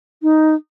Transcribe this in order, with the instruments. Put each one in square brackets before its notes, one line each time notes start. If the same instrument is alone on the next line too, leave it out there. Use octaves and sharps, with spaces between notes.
[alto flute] D#4